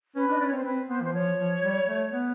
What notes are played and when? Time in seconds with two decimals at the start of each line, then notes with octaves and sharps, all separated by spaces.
0.15 C#4 B4
0.28 D4 D#5
0.39 C#4 D5
0.48 C#5
0.52 C4
0.56 C5
0.64 C4 B4
0.89 B3 C5
1.02 E3 C5
1.13 F3 C#5
1.38 F3
1.62 G3
1.86 A3
2.11 B3